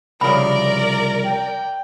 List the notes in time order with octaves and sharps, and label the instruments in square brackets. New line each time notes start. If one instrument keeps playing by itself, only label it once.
[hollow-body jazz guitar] C2 C#3 F3 [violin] A#4 D5 [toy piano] B5
[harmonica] G5